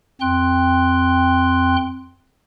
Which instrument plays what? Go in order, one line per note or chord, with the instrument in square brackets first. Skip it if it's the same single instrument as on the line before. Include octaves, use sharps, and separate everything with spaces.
[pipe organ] F2 C4 G5 C6 F#6